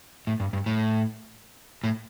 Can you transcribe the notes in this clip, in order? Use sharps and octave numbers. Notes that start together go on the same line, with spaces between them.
A2
G2
G2
A2
A2